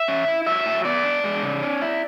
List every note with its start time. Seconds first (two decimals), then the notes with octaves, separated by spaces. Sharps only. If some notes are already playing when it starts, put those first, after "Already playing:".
Already playing: E5
0.08 C#4
0.28 E4
0.46 F#3 E5
0.66 A2
0.85 B3 D5
1.04 D4
1.24 G#3
1.42 C#3
1.62 C#4
1.82 E4